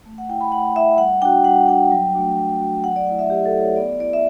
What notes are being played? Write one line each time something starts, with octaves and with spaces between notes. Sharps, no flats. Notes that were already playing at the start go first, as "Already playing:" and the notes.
A3
F#5
E4 G5
B5
A3 F#5
E4 E5
G3 F#5
D4 F#4 G5
G3 F#5
D4 F#4 G5
F#3
A3 D4 F#4
F#3
A3 D4 F#4
F#3 F#5
D5
A3 E4 F#5
E5
F#3 G4
A4
A3 E4
C#5
B3 D5
E4 D5
E5